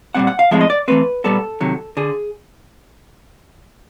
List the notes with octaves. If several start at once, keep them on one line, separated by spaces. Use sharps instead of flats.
A#2 G3 C4 F#5
F#5
F5
A2 F3 G#3 C4 E5
D#5
D5
E3 A3 C4 B4
A#2 G3 B3 A4
C3 D#3 F#3
D3 G#4